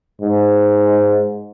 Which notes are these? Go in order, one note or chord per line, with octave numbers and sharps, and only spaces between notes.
G#2